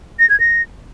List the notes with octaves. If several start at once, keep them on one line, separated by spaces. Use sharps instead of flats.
A#6
G#6
A#6